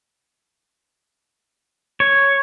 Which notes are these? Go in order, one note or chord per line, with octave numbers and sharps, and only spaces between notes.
C#5